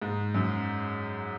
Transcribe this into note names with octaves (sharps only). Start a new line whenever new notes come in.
G#2
F#2